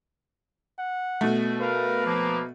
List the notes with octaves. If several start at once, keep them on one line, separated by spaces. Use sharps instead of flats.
F#5
B2 A3
A#4 B4 F5
F3 A#3